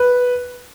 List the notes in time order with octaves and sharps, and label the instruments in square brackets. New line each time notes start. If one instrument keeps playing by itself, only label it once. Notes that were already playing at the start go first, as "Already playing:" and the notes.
Already playing: [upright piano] B4